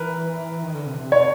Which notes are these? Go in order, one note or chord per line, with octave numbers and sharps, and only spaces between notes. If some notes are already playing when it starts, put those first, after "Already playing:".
Already playing: E3 A#4 B4
D#3
D3
C3
C3
C#5